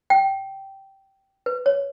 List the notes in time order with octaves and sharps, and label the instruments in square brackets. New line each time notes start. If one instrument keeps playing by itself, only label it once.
[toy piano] G5
B4
C#5